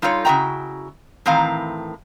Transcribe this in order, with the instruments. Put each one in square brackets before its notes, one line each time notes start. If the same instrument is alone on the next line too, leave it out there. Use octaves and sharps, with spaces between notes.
[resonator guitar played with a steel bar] G3 D#4 F4 A4 B4 C#5
C#3 E4 F#4 D#5 G5 A#5
A2 D#3 E3 C4 F5 A#5